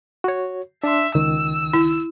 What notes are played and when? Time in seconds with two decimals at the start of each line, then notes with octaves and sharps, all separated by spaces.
0.24 F#4 C#5
0.84 D4 E5 C6
1.15 C#2 D#3 E6
1.73 E4